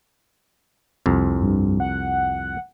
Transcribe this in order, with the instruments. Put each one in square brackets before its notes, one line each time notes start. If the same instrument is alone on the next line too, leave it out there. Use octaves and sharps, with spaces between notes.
[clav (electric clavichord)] C2 F2
[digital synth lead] G2
F#5